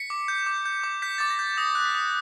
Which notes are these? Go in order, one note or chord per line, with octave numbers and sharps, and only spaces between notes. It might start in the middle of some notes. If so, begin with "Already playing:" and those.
Already playing: B6 C#7
D6
G6
D6
G6
D6
G6 B6
D6 A6
A#6
G6
D#6 A#6
F#6
B6
D#6